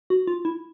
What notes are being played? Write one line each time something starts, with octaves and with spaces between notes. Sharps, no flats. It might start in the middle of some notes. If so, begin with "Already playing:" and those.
F#4
F4
E4